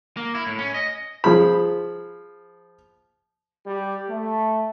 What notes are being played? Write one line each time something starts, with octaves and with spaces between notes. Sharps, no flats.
A#3
E4
A2
C#4
D#5
F3 G#4 B5
G3 G4
A3